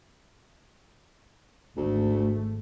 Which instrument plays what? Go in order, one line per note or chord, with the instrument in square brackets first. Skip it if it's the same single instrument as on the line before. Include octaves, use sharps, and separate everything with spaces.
[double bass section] G#1 A3 [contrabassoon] D2